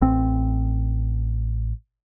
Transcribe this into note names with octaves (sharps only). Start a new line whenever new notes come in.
A1 C4